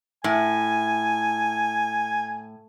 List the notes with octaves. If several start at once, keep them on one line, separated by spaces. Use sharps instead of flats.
A2 G#5